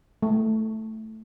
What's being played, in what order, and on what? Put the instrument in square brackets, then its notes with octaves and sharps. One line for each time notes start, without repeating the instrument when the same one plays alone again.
[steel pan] A3